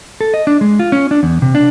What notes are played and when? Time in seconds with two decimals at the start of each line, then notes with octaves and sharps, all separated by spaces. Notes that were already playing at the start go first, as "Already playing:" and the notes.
0.21 A4
0.34 D#5
0.47 D4
0.61 G#3
0.79 F4
0.92 C#4
1.11 D4
1.23 E2
1.42 C3
1.55 D4